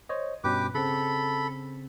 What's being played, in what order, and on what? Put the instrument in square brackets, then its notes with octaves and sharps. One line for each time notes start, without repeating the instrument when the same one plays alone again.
[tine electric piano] C5 C#5 D#5
[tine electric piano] G2 B2 C#4 [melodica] G4 B4 D6
[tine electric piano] C#3 C4 [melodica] A4 B5